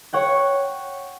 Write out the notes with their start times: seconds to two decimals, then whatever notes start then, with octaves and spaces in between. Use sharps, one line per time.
0.13 C#5 F#5 G5